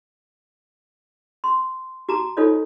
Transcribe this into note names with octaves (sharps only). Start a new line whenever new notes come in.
C6
F#4 A5 A#5 D6
D#4 F4 A4 C5 C#5 D#5